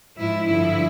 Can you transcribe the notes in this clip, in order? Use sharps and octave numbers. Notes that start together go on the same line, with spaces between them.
G#2 F3 E4
G2 D3 F3 E4